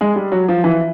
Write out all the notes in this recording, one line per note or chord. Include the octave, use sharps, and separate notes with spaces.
G#3
G3
F#3
F3
E3